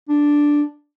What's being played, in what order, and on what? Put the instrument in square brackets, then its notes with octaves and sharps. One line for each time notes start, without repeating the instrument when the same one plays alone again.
[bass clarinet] D4